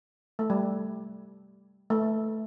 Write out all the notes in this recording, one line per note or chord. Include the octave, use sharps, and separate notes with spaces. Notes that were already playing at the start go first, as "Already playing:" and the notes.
A3
G3
A3